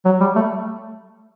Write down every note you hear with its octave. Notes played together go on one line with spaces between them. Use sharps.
F#3
G3
A3